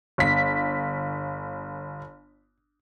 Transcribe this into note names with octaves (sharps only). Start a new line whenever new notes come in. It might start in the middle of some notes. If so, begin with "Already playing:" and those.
G1 B6